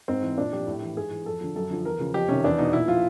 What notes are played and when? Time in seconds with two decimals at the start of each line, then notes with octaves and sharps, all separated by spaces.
0.08 G#2 C4
0.22 E3
0.38 A#2 D4
0.53 F3 G4
0.67 A2
0.82 E3
0.97 G#2 G#4
1.11 E3
1.26 F2 A4
1.41 D3 F3
1.56 F#2 A4
1.70 D3 F3
1.84 E2 A#4
2.00 C#3 F3
2.14 F2 G4
2.29 C3 D#3 C#4
2.44 E2 D4
2.58 B2 D#4
2.73 A#2 E4
2.88 F3 F4